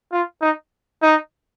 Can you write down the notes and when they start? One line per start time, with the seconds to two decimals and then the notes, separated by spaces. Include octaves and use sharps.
0.12 F4
0.41 D#4
1.02 D#4